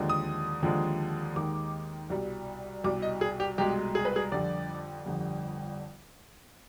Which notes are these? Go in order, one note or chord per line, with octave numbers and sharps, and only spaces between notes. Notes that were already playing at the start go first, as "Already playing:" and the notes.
Already playing: D#2 D3 F3 G#3
D#6
D#2 D3 F3 G#3
D#2 D#3 G#3 D6
C2 B2 G3
C2 B2 G3 D6
D#5
G#4
G4
C2 B2 G#3 G4
G#4
B4
G#4
F2 D3 G3 D5
G1 F2 D3 G3